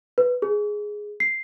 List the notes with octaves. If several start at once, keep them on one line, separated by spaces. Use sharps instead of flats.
B4
G#4
C7